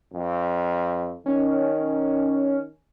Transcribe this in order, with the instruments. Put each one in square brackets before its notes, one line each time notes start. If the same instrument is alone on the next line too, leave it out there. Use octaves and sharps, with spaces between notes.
[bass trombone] F2
[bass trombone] D#3 [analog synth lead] C#4